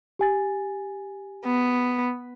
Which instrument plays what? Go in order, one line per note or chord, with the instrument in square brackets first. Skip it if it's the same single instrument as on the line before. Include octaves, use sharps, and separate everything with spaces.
[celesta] G4 G#5 A6
[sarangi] B3